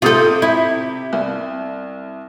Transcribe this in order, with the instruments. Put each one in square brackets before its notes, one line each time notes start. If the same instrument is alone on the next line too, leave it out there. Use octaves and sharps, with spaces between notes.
[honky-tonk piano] C3 D#6 G6 [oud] F4 A4
[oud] E4
[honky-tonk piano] C2